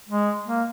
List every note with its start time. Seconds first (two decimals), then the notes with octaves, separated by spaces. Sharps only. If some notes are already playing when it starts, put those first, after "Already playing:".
0.09 G#3
0.48 A#3